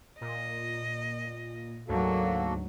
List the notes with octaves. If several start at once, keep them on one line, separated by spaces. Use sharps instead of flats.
A#2 D#5
D2 G#2 F#3 A#3 F#4 A4